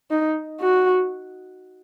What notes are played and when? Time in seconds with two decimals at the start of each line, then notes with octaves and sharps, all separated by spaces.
0.11 D#4
0.60 F#4